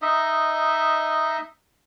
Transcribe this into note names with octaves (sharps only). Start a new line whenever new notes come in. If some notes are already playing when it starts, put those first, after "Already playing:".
D#4 D#5 E5